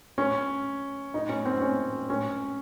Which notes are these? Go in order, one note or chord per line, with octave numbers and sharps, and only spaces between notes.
C#4
D#4
C#4
C4
C#4
C#4